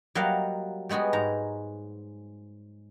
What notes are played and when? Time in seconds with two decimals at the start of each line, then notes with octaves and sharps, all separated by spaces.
0.15 F#3 G3 A#3 D#5 F5 F#5
0.89 G3 G#3 B3 F#4 G#4
1.13 G#2 A#5